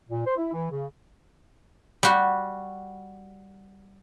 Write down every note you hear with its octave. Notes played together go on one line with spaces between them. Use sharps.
A#2
C5
E4
E3
C#3
G3 F#4